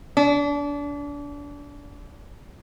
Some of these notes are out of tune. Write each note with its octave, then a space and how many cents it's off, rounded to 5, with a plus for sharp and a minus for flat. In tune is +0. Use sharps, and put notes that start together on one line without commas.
D4 -30